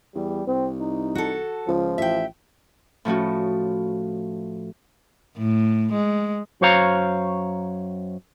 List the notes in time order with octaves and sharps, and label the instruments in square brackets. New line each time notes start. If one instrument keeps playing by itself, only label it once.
[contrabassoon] E2 [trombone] G3
[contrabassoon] C2 [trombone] C4
[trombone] D#4
[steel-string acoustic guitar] F#4 A4
[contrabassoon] C#2 [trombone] F3
[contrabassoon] A1 [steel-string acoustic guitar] E5 G5
[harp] A2 F3 C#4 F#4
[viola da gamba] A2
G#3
[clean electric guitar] F#2 F#4 C5 C#5 F5 A#5